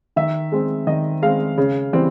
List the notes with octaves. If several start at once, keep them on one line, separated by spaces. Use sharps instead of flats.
D#3 E5
G#3 C4
D#3 D#5
G#3 C4 F5
C#3
E3 G3 C4